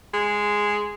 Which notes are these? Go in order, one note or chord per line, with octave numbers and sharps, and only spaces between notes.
G#3